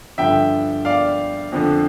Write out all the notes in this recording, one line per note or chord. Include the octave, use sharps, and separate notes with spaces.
G2 D3 F3 E5 G5
D5 F5
F2 D3 F3